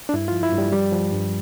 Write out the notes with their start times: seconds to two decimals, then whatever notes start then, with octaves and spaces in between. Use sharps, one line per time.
0.09 D4
0.13 G2 E4
0.28 F3 F4
0.43 E4
0.53 G2
0.58 G3
0.72 F3 G3
0.92 F3
1.12 G2